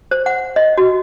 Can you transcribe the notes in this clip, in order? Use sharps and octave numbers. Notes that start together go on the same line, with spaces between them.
C5
F#5
D#5
F#4